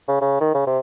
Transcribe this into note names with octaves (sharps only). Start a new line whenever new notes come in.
C#3
C#3
D#3
C#3
C3